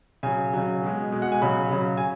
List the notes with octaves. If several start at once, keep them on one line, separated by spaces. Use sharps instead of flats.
C#3 F#3 G#5
C#3 F#3
B2 G#3
B2 G#3
F#5
G#5
C#3 F#3 B5
C#3 F#3
G#5